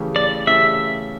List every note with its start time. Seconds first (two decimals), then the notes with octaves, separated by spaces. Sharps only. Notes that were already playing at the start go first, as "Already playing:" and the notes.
Already playing: C#3 E3 A3 C#4 G4
0.16 D5
0.47 C#3 E3 A3 C#4 G4 E5